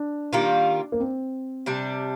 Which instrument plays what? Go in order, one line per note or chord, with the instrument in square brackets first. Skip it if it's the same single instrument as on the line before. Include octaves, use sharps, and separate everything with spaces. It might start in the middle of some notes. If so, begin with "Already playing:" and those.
Already playing: [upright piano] D4
[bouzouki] D#3 G3 A#3 F4
[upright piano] A#3
C4
[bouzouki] C3 G3 D4